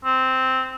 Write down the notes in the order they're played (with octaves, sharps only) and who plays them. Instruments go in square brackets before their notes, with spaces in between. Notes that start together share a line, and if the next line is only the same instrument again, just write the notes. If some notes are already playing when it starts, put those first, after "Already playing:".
[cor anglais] C4